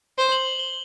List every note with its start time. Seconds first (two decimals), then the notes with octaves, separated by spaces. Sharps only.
0.18 C5 G7
0.32 F#7
0.59 G7